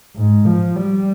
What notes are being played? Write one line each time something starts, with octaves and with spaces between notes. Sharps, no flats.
G#2
F3
G3